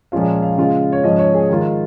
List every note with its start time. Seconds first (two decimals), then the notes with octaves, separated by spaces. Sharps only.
0.12 A#2 F3 G#3 C#4 F4 F5
0.42 F5
0.57 C#3 G#3 F4 F5
0.92 C#5
1.04 G#2 F3 C#4 D#5
1.19 C#5
1.34 G#4
1.49 D#3 G#3 F4